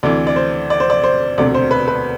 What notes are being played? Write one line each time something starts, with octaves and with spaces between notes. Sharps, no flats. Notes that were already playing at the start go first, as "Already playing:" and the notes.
D2 C3 E3 D5
D5
C5
D5
C5
D5
C5
E1 D2 C3 D5
C5
B4
B4